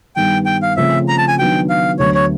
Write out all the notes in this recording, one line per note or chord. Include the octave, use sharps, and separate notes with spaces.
G2 D#3 G3 B3 G5
G5
F5
C#3 F3 A3 C4 E5
A#5
A5
G#5
D#3 F#3 B3 D4 F#4 G5
F5
D2 D3 F#3 B3 C#5
C#5